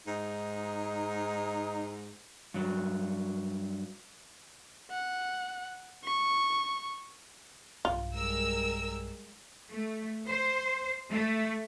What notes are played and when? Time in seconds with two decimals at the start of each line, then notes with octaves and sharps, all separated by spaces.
0.07 G#2 D#4
2.54 G2 F#3
4.91 F#5
6.04 C#6
7.85 B1 G2 F4
8.15 G3 G#3 A#4 E6
9.70 A3
10.28 C5
11.13 A3